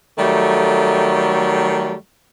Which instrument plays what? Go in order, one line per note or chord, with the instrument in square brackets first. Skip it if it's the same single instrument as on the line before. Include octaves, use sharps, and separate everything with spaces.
[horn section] D#3 F#3 G3 A3